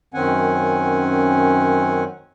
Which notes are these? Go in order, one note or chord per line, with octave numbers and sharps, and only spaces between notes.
F#2 D#3 C4 C#4 F#5 G#5